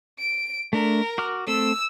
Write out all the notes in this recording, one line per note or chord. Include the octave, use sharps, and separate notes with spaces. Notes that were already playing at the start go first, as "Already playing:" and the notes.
D7
A3 D4 A#4
F#4 D6 F6
A3 C4 A4 E6